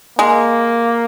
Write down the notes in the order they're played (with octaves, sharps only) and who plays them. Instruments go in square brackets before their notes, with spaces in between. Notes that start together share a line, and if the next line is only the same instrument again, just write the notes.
[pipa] G#3 [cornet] A#3